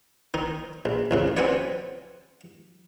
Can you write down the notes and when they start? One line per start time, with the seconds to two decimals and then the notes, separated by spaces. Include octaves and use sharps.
0.34 D#3 D#4
0.85 A#1
1.11 A1 F2 C#3
1.37 C4 C#4 F#4 B4 C#5 D5